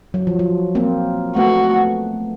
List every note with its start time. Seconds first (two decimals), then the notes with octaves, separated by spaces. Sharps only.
0.14 F#3
0.27 F3
0.39 F#3
0.75 A#3 C4
1.36 A3 B3 F#4